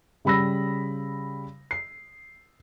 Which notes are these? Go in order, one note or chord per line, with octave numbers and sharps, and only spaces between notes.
C#3 G3 B5 E6 A#6
C7